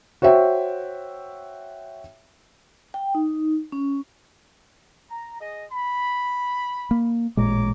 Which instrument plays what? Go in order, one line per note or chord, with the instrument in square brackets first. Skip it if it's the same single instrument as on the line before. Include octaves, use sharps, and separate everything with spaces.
[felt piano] F#4 C5 C#5 E5 G5
[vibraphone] G5
D#4
C#4
[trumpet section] A#5
G#4 D#5
B5
[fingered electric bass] A#3
[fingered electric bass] A1 A#2 G#3 [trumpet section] C#5 A#5 D6